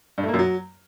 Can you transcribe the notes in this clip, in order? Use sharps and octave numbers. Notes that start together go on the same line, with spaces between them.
G2
A3
A#3
F#2
F#3